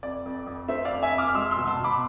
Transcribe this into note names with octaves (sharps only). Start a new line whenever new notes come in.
F2 D5
F2
F2
A3 C5 E5
D5 F5
F2
E5 G#5
F2 D6 F6
F6
G#3 C6 E6
C6 E6
B2
A5 C6
B2 B5 D6